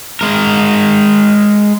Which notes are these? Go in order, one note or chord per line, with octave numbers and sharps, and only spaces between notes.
G#3 A#4